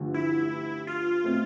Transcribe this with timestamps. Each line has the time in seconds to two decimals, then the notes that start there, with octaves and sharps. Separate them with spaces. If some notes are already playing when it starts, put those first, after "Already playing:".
Already playing: A1 G2 D3 F3
0.14 E4
0.87 F4
1.24 B2 A3 C4